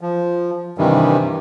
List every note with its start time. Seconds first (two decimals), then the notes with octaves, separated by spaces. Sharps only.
0.01 F3
0.78 G2 C3 D#3 E3 G3